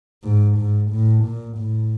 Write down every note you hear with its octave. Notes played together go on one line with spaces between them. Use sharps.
G#2
G#2
A2
A#2
A2